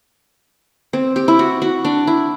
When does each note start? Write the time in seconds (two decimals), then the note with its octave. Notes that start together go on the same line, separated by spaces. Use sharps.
0.93 C4
1.16 G4
1.28 E4
1.39 F#4
1.62 F#4
1.85 D4
2.07 E4